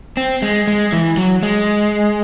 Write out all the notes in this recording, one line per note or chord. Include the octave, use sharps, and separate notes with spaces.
C4
G#3
G#3
E3
F#3
G#3